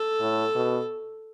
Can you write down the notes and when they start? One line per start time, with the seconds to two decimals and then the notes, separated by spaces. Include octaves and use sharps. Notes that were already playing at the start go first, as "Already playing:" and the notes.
Already playing: A4
0.20 A2
0.56 B2